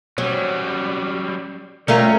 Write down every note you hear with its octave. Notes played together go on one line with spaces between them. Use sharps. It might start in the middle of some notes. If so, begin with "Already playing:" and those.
F#3 G3 C#4
G3 A3 C#4 F4 A#4 A#5